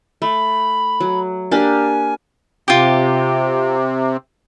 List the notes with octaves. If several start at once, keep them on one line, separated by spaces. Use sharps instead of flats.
A3 B5
F#3
A#3 D4 G4 G#5
C3 F4 G4